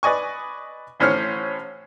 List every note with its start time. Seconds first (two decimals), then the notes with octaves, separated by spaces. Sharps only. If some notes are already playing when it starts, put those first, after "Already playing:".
0.03 B4 D5 D#5 G#5 C#6
1.00 A1 A2 C#4 C5 C#5 F6